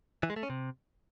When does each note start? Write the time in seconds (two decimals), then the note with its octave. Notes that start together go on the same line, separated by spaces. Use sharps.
0.23 E3
0.30 G#3
0.36 A3
0.43 C#4
0.50 C3